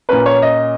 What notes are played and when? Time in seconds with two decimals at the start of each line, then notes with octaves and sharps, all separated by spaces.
0.09 A#2 A#3 C#4 B4
0.26 C#5
0.42 D#5